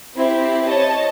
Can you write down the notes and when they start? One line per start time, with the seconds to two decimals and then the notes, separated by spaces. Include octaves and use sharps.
0.16 C4 E4 G4
0.65 C#5 D#5 A5